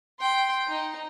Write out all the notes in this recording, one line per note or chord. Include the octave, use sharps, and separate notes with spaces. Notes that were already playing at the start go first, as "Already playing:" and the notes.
G5 C6
D#4